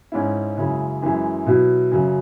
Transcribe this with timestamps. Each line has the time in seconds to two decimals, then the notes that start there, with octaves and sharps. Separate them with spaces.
0.12 G#2 G#3 C#4 E4
0.57 F#2 C#3 G#3 E4
1.02 F#2 E3 G#3 E4
1.46 B2 F#3 E4
1.91 F#2 C#3 F#3